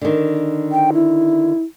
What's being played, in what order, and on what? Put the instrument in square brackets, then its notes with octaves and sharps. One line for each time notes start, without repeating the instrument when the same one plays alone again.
[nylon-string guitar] D3 D#3
[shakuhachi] G5
E4